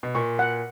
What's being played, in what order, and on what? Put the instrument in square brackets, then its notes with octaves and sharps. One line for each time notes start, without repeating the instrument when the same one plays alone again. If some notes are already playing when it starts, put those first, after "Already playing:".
[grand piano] B2
[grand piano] A#2 [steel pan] C#6
[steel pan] F#5